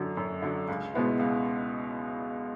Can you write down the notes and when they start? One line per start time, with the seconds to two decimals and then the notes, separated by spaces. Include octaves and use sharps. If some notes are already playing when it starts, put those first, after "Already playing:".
Already playing: F#2 D3 F#3
0.17 F#2
0.42 D3 F#3
0.68 C#2
0.93 B2 G#3 B3 E4
1.19 C#2